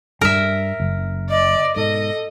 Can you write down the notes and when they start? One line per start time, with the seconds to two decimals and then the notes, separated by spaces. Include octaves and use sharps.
0.21 G2 G3 A#4 E5
0.80 F#1
1.30 D5 D#5
1.76 G#2 B2 A4 D#5